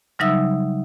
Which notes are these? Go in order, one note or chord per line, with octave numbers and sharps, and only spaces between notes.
C#3 F#3 G3 D#4 E5 E6